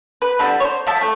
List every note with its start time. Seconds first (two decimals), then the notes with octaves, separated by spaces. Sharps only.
0.22 B4
0.39 D3 G3 B3 E4
0.60 C5 C#5
0.87 F3 E5 A5
1.01 A3